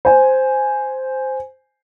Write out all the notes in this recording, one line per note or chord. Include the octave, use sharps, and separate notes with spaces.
C5 G#5